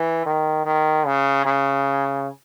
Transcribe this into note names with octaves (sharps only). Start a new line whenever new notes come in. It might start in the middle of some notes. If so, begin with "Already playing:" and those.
Already playing: E3
D#3
D#3
C#3
C#3